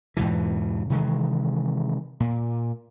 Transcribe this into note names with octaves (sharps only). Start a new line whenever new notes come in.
E2 G#2 B2 E3
C3 D#3 E3 G#3
A#2